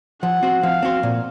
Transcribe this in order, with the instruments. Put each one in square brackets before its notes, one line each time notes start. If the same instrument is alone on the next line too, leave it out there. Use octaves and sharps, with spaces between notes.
[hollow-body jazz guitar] F3 [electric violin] F#5
[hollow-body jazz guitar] C4 F#4 C5
[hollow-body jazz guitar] F3 [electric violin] F5
[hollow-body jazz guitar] C4 F#4 C5
A#2